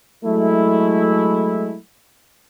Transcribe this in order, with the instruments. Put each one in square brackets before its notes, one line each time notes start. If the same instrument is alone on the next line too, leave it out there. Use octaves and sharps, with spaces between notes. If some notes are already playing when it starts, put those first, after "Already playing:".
[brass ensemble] F#3 G#3 A3 E4